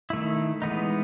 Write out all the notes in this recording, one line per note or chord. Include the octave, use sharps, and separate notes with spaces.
D#3 A3 E4
E3 G#3 B3 D#4